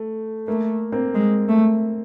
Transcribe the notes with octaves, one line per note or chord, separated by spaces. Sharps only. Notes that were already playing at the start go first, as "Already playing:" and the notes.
Already playing: A3
A3 A#3
A#3 C4
G#3
A3